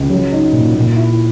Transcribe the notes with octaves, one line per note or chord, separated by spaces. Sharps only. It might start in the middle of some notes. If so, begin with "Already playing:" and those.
Already playing: C#2
F#3
D#4
A#2
A#2
E4